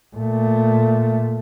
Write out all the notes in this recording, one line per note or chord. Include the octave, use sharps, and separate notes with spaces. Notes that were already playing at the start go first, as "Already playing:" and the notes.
A#2 A3